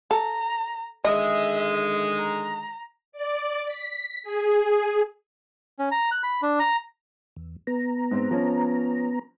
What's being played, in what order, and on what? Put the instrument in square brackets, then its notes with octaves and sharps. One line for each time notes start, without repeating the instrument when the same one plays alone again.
[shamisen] A4 [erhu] A#5
[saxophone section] D3 D#3 G#3 [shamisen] D#5 [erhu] E5
[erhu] A#5
[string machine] D5
B6
G#4
[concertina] C#4
A#5
F#6
B5
D4
A#5
[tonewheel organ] E2
B3 A#5
[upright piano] G#2 C4
F3 C#4